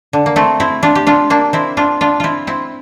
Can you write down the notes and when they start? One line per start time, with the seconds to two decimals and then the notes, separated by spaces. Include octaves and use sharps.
0.13 D3
0.26 A#3
0.36 A3 C4
0.60 C4 E4
0.83 D4 F4
0.95 G4
1.07 D4 F4
1.30 A#3 D4
1.53 C4 E4
1.77 D4 F4
2.01 D4 F4
2.20 C4 E4 F4
2.47 C4 E4